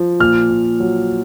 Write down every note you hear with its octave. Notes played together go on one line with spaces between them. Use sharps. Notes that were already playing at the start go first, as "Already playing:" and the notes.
Already playing: F3
A#2 F6
A#2
F#3